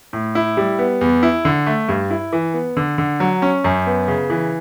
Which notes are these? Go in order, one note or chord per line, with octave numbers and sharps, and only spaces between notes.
A2
E4
G3
B3
E2
E4
D3
A3
G2
E4
E3
B3
D3
D3
F#3
C#4
F#2
B3
C#3
E3